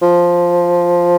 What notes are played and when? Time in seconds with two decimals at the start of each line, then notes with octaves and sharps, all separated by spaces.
0.02 F3